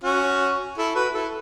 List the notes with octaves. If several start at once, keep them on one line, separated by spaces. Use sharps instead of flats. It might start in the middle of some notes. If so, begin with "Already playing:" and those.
C#4 F#4
E4 A4
F#4 B4
E4 A4